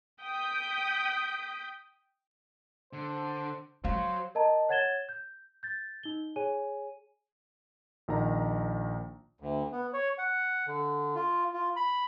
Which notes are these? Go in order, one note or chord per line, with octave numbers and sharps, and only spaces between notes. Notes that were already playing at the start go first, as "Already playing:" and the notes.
G5 D#6 G6 B6
D3 C5
F#3 F4 C5 F5
A#4 D#5 A5 A#5
C#5 F#5 G#6 A6 E7 G7
G6
G6 A6
D#4 G7
G#4 C#5 G#5 D#7
A#1 D#3 A#5
D2
B3
C#5
F#5
D3
F4
F4
B5